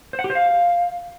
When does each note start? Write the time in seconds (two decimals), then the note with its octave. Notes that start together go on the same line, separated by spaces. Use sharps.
0.13 C5
0.19 F#5
0.24 G4
0.30 C5
0.35 F5